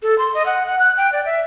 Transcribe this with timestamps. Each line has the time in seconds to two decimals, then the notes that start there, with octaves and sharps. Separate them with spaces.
0.03 A4
0.18 C6
0.34 D#5
0.46 F#5
0.66 F#5
0.79 F#6
0.97 G5
1.13 D5
1.25 E5